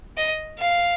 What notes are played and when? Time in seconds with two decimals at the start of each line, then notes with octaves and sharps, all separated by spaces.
0.17 D#5
0.59 F5